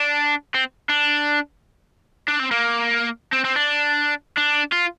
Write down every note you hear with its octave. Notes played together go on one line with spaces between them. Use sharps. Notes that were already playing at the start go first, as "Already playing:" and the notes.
Already playing: D4
C4
D4
D4
C4
A#3
C4
C4
D4
D4
F4